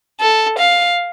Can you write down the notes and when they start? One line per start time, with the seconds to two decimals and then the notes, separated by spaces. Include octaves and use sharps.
0.20 A4
0.58 F5